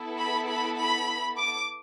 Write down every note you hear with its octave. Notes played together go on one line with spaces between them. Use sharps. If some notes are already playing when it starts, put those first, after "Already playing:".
Already playing: B3 E4 A4
B5
B5
B5
D6